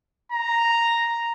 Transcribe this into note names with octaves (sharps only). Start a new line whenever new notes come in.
A#5